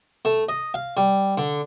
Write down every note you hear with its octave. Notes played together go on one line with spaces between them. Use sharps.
A3
D#5
F5
G3
D3